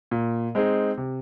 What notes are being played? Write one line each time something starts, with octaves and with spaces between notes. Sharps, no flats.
A#2
G#3 C4 D#4 G#4
C3